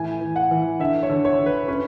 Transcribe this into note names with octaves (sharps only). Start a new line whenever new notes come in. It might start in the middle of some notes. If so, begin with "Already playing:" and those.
Already playing: A2 E3 G#5
E3
F#5
E3
D3 E5
C#5
D3
C#5
D3
B4
C#4 B4